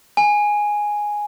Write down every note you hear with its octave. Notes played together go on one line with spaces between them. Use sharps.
G#5